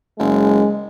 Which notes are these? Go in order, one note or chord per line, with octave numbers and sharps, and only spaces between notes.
F#1 G#3